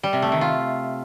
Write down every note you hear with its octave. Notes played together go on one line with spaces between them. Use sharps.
G3
C3
A3
D#3
F4